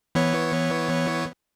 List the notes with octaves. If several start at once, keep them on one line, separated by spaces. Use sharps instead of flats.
E3 B3 C#5